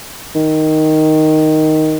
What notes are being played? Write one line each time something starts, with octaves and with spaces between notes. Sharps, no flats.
D#3